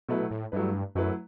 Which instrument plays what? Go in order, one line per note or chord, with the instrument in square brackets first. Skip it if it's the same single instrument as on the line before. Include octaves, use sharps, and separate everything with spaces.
[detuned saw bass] B2 [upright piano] F#3 A3 E4 B4
[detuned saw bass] A2
[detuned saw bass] G2 [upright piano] F#3 A3 E4 B4
[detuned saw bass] F#2 [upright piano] F#3 A3 E4 B4